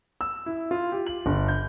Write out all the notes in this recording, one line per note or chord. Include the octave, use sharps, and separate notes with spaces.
E6
E4
F4
G4
F#7
G1
G6